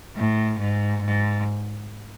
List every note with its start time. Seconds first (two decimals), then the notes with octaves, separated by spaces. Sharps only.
0.16 A2
0.59 G#2
1.02 G#2